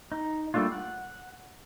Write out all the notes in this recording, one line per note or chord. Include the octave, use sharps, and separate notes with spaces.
D#4
G3 A3 A#3 D4 F4
F#5